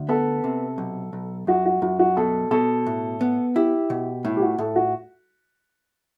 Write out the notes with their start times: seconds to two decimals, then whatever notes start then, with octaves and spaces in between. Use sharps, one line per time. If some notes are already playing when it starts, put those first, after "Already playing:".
Already playing: D2
0.09 B3 A4
0.44 C3
0.78 B1
1.13 B1
1.47 F#2 F#4
1.66 F#4
1.82 F#2 F#4
1.99 F#4
2.17 B2 A4
2.51 B2 A4
2.86 A2
3.21 B3
3.56 E4 G4
3.90 B2
4.24 A2 E4
4.37 G4
4.42 F#4
4.58 A2 A4
4.76 F#4